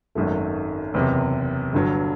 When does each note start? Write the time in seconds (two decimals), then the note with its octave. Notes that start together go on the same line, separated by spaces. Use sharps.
0.15 G#1 F#2 D#3 F#3 A3
0.94 F#1 E2 C3
1.73 G1 G2 D3 F#3